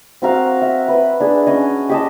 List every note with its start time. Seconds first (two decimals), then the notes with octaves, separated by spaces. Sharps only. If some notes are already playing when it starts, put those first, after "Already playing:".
0.22 C4 F#4 A#4 F5
0.62 E5
0.88 B4
1.20 D4 G#4
1.47 C#4 C#5 D#5
1.89 G4 D#5 A5